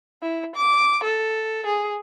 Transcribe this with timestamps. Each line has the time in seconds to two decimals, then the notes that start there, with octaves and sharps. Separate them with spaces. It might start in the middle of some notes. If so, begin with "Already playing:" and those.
0.22 E4
0.56 D6
1.04 A4
1.66 G#4